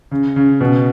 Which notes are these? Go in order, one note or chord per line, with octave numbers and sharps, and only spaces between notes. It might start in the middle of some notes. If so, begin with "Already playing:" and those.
C#3
C#3
B2